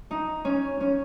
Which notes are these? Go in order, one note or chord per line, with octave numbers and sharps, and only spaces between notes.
D#4
C#4
C#4